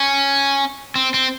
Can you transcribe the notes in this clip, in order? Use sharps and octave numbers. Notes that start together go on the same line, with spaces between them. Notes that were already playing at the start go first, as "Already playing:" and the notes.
Already playing: C#4
C4
C4